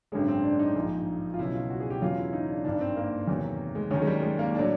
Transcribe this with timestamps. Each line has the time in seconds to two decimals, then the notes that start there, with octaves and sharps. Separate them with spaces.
0.12 A1 G2 D3 F#3 G#3
0.28 C4
0.44 D4
0.59 D#4
0.75 A#1 G#2 F3
1.34 F4
1.39 C#2 B2 F#3 E4
1.54 F4
1.70 F#4
1.80 G#4
1.90 G4
2.01 E2 C#3 F#3 F4
2.17 E4
2.33 D#4
2.50 D4
2.64 G#1 G2 D#3 D4
2.81 C4
2.97 A#3
3.27 E2 C3 D#3 F#3
3.75 G#3
3.91 D#2 D#3 F#3 C#4
4.02 G#3
4.07 G3
4.22 G#3
4.39 A#3
4.55 A2 F#3 D4